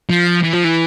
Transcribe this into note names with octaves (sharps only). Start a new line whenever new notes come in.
F3
E3
F3
E3